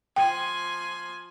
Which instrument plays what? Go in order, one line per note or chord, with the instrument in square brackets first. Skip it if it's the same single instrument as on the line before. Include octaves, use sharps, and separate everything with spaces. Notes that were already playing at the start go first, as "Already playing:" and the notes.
[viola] F3 G#5 [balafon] G5